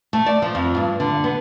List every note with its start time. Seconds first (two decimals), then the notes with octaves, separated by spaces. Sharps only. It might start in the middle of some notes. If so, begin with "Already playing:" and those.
0.13 A3
0.26 D5
0.42 F3
0.55 F2
0.76 G2
1.00 D3
1.24 B3